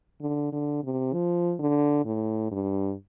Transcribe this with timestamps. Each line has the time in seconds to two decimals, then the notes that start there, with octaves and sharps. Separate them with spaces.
0.21 D3
0.52 D3
0.83 C3
1.13 F3
1.59 D3
2.05 A2
2.51 G2